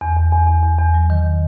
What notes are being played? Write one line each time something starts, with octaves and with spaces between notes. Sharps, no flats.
E2
E2
E2
E2
E2
E2
F#3
D#3